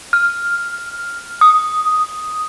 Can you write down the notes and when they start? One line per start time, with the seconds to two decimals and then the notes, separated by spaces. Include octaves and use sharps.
0.13 F6
1.41 D#6